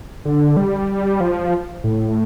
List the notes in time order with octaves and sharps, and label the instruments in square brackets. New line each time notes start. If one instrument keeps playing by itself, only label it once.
[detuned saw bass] D3
G3
F3
A2